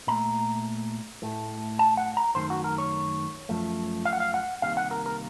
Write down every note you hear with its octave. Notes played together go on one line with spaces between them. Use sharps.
A#2 A3 A#5
A2 A3
A5
F#5
A#5
F#2 D#3 A3 C5
F#4
A#4
C#5
F#2 F3 A3
F5
F#5
F5
F#5
C2 C3 D#3 A#3 F5
F#5
A#4
A#4